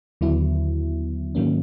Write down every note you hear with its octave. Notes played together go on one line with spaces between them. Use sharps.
D#2 D3 F#3 B3 E4
G#2 D#3 F#3 A#3 C#4